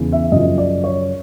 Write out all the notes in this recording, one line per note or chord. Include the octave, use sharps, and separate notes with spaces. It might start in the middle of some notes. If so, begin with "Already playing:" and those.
Already playing: E2 C#3 E3
E5
F#2 C#3 F3 D#5
D5
C#5